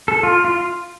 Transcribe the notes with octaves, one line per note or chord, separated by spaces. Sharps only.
A4
F4
F4